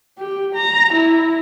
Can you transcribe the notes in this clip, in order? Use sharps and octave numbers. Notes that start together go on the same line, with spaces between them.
G4
A#5
E4